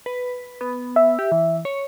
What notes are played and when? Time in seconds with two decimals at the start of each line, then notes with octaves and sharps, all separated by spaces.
0.06 B4
0.61 B3
0.96 E5
1.19 G4
1.32 E3
1.65 C#5